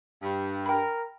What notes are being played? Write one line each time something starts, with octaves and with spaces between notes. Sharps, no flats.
G2
A#4 G5 B5